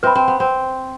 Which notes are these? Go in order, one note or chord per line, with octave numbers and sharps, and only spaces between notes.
C4 B4 E5 B5
C4
B3
C4